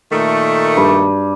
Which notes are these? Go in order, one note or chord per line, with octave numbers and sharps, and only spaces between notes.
A#2 D#3 A3
G2